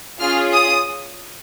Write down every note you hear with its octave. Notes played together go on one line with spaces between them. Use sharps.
C#4 F4 G#4 F6
D#6